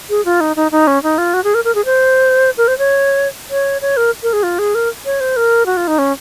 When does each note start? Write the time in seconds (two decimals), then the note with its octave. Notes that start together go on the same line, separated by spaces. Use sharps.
0.10 G#4
0.25 F4
0.41 D#4
0.56 D#4
0.72 D#4
0.87 C#4
1.03 D#4
1.18 F4
1.34 F#4
1.44 G#4
1.54 A#4
1.65 A#4
1.75 G#4
1.85 C5
2.58 A#4
2.68 C5
2.78 C#5
3.51 C#5
3.82 C#5
3.97 A#4
4.23 A#4
4.33 G#4
4.43 F4
4.59 G#4
4.75 A#4
5.06 C#5
5.21 C5
5.37 A#4
5.66 F#4
5.77 F4
5.87 D#4
5.99 C#4